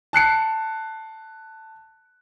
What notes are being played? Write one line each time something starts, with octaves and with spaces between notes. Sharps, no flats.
A5 F#6 C7 C#7